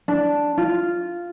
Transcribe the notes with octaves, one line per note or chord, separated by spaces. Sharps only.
D4
F4